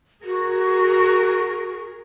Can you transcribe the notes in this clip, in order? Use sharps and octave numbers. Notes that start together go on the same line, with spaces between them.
F#4 G#4 A#4